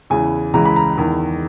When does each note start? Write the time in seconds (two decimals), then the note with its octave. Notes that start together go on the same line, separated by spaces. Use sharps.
0.10 E2 C#3 E3 G#5
0.53 C#2 C#3 E3 A#5
0.65 B5
0.76 A#5
0.97 E2 D#3